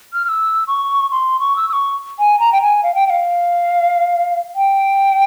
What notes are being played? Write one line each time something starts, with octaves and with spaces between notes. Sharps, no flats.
F6
F6
E6
C#6
C6
C#6
E6
E6
C#6
G#5
A#5
G5
G#5
F5
G5
G5
F5
G5